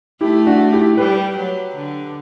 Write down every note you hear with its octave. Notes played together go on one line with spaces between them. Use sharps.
A3 E4 G4
D4 F#4
E4 G4
G3 G4 B4
F#3
D3